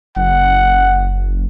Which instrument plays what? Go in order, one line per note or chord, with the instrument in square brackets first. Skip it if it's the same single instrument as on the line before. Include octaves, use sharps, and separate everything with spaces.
[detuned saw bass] F#1 [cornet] F#5